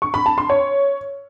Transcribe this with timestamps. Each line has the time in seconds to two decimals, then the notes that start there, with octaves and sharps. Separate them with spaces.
0.02 C#6
0.14 B5
0.26 A5
0.38 C6
0.50 C#5